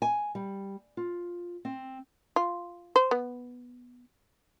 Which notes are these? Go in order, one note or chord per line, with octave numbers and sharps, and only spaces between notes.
G#5
G3
F4
C4
F4
C5
B3